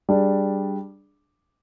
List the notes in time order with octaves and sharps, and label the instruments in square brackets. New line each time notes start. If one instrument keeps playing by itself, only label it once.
[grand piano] G3 D4 G#4